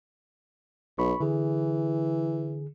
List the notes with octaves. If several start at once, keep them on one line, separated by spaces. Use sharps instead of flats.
B1 B5 C#6
D3 E3 G#4